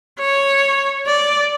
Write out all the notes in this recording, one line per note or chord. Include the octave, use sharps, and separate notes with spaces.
C#5
D5